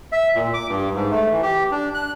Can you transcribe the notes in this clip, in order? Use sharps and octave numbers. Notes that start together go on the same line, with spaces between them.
E5
A#2
D6
G2
G#2
A3
E3
G4
D4
F#6